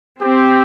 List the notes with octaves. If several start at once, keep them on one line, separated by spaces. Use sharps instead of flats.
C4 G4